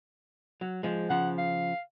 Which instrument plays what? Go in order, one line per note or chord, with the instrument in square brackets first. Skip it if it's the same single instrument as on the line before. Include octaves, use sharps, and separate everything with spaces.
[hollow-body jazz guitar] F#3
F3 G#3
[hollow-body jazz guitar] C#3 F3 [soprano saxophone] F#5
[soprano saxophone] F5